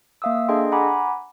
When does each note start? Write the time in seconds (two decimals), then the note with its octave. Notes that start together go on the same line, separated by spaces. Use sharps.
0.22 A#3 E5 F5 D#6 E6
0.49 D4 G#4 A4 D#5 G5 C6
0.72 F#5 G#5 A#5 B5 D6